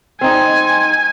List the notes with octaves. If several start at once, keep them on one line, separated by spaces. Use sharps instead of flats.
C4 D#4 G#5